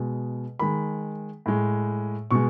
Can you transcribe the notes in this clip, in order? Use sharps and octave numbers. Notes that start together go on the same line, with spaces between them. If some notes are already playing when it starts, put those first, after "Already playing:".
Already playing: B2 G#3
D#3 G#3 B5
A2 G#3
B2 G#3 C#6